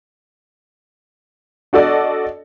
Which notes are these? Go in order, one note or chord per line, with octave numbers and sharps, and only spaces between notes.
D4 F#4 A4 D5 D#5